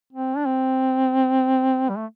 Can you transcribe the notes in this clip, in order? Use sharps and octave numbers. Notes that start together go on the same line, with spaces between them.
C4
D4
C4
G3
A3